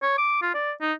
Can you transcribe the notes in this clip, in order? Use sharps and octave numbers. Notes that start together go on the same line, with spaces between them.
C#5
D6
F4
D5
D#4